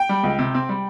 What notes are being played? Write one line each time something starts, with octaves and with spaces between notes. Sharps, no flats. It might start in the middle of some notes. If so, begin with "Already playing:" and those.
Already playing: G5
G3
C#2
C3
C4
G3